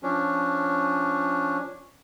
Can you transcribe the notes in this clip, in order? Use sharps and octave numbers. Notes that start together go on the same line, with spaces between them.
F3 C#4 D4